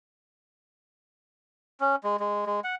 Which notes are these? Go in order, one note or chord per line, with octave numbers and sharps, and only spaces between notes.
C#4
G#3
G#3
G#3
F#5